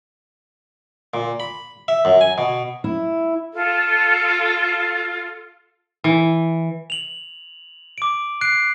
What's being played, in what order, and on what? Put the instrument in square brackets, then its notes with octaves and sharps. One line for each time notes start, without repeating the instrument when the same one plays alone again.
[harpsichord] A#2
B5
E5
F#2
G#5
B2
[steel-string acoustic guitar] E4
[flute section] F4 A4
[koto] E3
[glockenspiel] F7 F#7
D6 D7
F#6 C7 D7